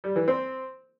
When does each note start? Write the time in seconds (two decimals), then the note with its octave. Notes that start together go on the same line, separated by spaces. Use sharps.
0.04 G3
0.16 E3
0.28 C4